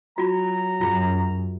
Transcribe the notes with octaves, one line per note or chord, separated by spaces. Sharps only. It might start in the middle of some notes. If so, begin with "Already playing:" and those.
F#3 F4 F#4 A#5
F#2 F4 G#4